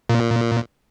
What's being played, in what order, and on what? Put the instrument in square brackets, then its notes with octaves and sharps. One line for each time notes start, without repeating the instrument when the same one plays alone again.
[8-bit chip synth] A#2